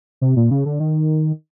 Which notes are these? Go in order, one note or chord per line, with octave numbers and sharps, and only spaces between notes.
C3
A#2
C#3
D3
D#3